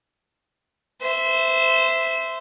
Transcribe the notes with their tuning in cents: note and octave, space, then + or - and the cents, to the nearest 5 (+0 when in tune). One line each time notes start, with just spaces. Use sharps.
C5 -20 E5 +0